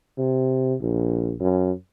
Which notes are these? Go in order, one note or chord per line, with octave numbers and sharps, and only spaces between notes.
C3
A#1
F#2